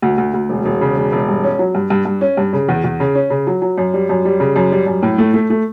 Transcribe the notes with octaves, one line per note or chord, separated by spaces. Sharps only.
D2
D2
D2
E1
E1
C#3
E1
E1
G2
C#4
F#3
G2
G2
G2
C#4
G2
C#3
E2
E2
C#3
C#4
C#3
F#3
F#3
F#2
G3
F#2
G3
C#3
F#2
G3
F#2
A2
A3
A3
A3